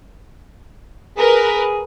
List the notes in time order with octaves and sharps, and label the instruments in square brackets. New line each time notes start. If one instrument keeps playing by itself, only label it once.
[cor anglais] G#4 [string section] A#4 B4